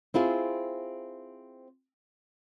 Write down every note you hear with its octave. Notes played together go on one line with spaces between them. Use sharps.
C4 E4 F4 G#4